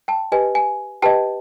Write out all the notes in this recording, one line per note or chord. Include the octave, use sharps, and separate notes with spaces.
G5 A5
G4 B4 D#5 G#5
G#5
G4 B4 D#5 G5 A5